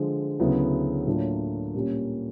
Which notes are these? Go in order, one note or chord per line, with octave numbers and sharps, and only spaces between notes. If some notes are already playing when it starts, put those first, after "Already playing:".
Already playing: D3 F3 G#3
D2 C#3 F#3 B3 E4
A2 F#3 A#3 D4 F4
A#2 G3 A#3 C#4